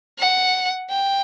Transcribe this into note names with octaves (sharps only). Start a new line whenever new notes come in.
F#5
G5